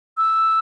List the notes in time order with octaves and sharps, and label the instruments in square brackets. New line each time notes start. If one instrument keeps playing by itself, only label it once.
[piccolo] E6